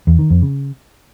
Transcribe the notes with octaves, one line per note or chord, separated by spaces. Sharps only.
E2
D#3
F2
C#3